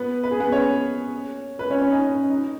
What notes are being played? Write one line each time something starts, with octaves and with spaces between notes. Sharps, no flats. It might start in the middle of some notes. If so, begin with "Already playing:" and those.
Already playing: B3 B4
B4
G#4
B3 B4
C#4 C#5
B4
C#4 C#5
C#4
D#4
C#4
D#4